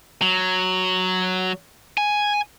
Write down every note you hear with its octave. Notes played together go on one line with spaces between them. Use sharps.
F#3
G#5